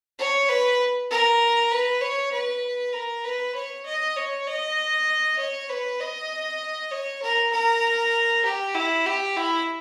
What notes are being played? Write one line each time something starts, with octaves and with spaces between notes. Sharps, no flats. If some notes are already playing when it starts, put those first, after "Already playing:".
C#5
B4
A#4
B4
C#5
B4
A#4
B4
C#5
D#5
C#5
D#5
C#5
B4
D#5
C#5
A#4
A#4
G4
E4
G4
E4